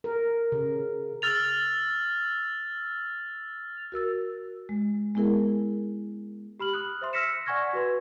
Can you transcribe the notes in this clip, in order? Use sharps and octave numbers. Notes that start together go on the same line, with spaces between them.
A#4
C#3
E6 F6 A6 F7
F#4 A#4 E6 A6
G#3
G#3 B3 E4 G#4 A#4
G4 B5 F6 F#7
D#6 F#6
C5 E5 C6
E6 F6 A#6 B6 C#7 E7
D5 F#5 G#5 C#6 G#6 A#6
F#4 B4 C6